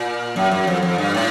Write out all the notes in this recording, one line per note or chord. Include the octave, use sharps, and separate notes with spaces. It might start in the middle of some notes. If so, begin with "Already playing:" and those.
Already playing: A#2
F#2
F#2
F2
F2
G2
A2